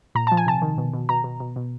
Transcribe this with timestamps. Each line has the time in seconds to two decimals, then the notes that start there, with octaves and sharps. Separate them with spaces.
0.15 A#2 A#5
0.27 F3 A5
0.37 G#5
0.46 C3 A5
0.62 D#3
0.78 B2
0.94 B2
1.09 B2 A#5
1.24 B2
1.40 B2
1.56 B2